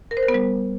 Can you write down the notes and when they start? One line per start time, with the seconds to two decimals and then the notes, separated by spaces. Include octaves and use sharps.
0.11 A#4
0.17 C5
0.23 A#4
0.28 B3
0.34 G3